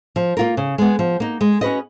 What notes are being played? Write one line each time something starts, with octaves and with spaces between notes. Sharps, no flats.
F3
A#3 F4 A#4
C#3
G#3 B3
F3
A#3 D#4
G#3
C#4 F#4 B4 D#5